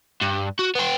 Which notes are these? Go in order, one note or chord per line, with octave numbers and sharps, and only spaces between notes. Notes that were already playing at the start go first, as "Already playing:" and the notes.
G2
F#4
B3 G5